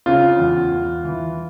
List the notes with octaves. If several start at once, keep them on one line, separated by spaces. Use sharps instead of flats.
C#3 F4
E2
E2
E3